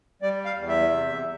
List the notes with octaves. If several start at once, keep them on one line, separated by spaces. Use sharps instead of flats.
G3 D5
F5
E2
E5
C3